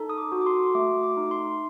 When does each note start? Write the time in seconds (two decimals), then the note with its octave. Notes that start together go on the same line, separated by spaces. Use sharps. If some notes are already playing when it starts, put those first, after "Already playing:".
Already playing: D#4 A4
0.09 D#6
0.18 D6
0.32 F#4
0.42 D6
0.46 C6
0.75 A3 D6
1.03 D6
1.17 D#4
1.31 C6